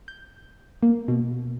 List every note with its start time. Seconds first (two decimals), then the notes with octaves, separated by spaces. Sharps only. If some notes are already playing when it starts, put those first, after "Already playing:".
0.08 G6
0.83 A#3
1.08 B2